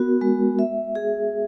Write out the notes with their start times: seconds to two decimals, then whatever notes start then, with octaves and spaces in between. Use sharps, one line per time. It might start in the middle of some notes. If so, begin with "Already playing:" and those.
Already playing: B3 F#4 A#4
0.21 G#3
0.59 E5
0.95 G#4